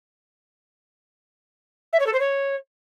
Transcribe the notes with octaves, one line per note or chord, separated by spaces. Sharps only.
E5
C#5
A4
C5
C#5